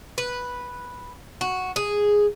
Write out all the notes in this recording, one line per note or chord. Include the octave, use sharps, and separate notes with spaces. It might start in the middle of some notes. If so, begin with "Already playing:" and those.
B4
F#4
G#4